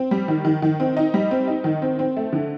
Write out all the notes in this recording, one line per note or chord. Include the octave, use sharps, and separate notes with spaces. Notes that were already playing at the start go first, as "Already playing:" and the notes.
Already playing: C4
G3
D#3
D#3
D#3
C4
D#4
G3
C4
D#4
D#3
C4
C4
A3
D3